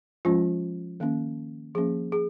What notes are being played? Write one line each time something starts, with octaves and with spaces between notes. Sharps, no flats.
F3 G#3 C#4 F4
D#3 A#3 C#4
F3 A#3 C#4 G#4
G#4